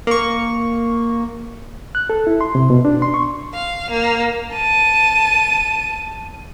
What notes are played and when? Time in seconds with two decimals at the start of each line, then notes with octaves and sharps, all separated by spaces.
0.07 A#3 C#6
1.95 F#6
2.10 A4
2.27 E4
2.41 C6
2.55 C3
2.70 B2
2.85 D4
3.02 C6
3.14 C#6
3.54 F5
3.91 A#3
4.53 A5 D#7